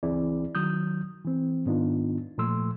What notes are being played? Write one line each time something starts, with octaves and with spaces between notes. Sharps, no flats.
C#2 E3 C4 E4 G#4 D5
D#3 F#3 D#6 G6
E3 C4
G#2 D#3 B3 D4 D#4 F4
A#2 F3 A3 C6 E6